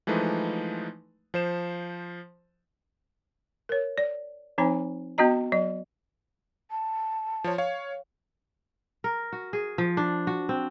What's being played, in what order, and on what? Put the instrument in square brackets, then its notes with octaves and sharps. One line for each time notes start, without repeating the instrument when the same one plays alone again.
[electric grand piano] E3 F3 G#3 A3 D#4 B4
F3 C5 E7
[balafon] A#4 C#5
D5
F3 C4 D4 D#4 C5 G#5
B3 D4 F#4 D#5 A#5
F#3 D#5
[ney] A5
[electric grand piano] F3 C#5
C#5 F5
[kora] A#4
F#4
G#4
F3
D4
F#4
C4